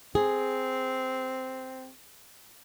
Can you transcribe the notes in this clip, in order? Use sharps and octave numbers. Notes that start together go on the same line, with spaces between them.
C4 G#4